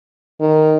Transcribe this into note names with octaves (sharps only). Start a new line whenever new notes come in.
D#3